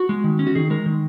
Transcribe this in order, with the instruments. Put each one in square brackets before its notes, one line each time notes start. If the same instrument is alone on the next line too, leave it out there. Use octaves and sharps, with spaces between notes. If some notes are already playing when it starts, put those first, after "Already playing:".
Already playing: [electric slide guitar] F#4
G#3
D#3
C#4
F#4
D#3 G#4
G#3 A#4
D#3